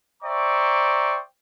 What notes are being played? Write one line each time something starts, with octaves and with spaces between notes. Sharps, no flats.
C5 D5 E5 G5 A#5 C#6